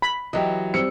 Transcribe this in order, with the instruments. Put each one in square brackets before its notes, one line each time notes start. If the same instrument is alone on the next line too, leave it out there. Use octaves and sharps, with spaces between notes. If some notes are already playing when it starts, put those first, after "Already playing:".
[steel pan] B5
[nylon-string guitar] E3 F#3 G4 [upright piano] D#5
[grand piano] G3 C4 E6 [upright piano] C#7